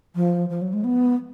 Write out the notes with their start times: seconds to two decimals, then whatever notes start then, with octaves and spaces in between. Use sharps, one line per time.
0.15 F3
0.49 F3
0.61 F#3
0.73 G#3
0.84 B3